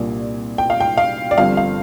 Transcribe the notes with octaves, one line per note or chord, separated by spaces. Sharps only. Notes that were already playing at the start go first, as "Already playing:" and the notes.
Already playing: C2 A#2 A#3 D4
G5
F5
G5
F5
D5
G1 G2 F3 C4 F5
F5